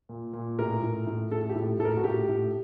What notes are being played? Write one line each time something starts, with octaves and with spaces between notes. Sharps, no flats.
A#2
A#2
A2 A#4
A2
A2
A2 A4
G4
A2
A2 A4
A#4
F#4
A2 G4
A2